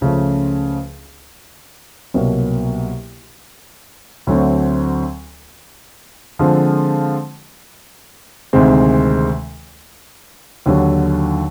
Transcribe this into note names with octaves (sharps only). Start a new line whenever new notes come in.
C#2 C#3 F3 A3 C#4
C2 B2 F#3 A#3
D2 D3 F#3 A3 C4
D3 F3 G#3 C4
D2 C3 D#3 G#3 C4
D#2 D3 F#3